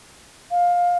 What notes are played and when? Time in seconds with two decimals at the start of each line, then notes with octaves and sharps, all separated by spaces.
0.51 F5